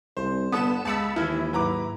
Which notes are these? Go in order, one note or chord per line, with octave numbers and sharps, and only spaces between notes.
C2 C5
G1 B3 A4 A5 D#6 E7
C#2 G#3 A5 B5 E6 C#7
D#2 E3 E4 F6
G#2 F#3 B4 A#5 D6